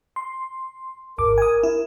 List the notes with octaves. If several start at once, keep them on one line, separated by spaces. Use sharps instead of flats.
C6
G#1 A#4 D6
G#5 D#6
E4